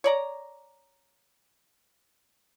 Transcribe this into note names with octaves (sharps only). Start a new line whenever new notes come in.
C#5 D5 A#5